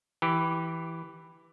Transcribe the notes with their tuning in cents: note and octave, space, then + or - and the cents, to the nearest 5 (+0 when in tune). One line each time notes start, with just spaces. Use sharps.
E3 +0 G4 +0